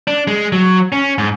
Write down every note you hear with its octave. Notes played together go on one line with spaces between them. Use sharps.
D4
G#3
F#3
C#4
G#2